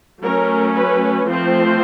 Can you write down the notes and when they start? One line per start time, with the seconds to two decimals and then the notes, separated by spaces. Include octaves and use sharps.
0.21 F#3 A3 C#4 A#4
0.75 B4
1.27 F3 A3 C4 C5